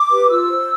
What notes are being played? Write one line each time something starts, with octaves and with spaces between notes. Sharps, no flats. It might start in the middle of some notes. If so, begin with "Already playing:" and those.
Already playing: D6
G4 B4
F4 E6
C5